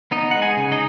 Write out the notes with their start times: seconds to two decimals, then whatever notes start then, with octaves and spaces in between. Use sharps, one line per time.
0.11 B3 D#4 D#5
0.31 G#3 F#5
0.42 G#4 G#5
0.57 C#3
0.72 D#4 D#5